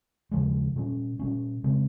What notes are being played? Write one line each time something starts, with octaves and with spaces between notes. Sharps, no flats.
D#2 C#3 F3 G#3
A#2 G3 C#4
A#2 G3 C#4
C#3 G#3 C4